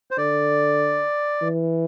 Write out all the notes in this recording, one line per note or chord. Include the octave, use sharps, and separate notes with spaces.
C5
D3 D5
E3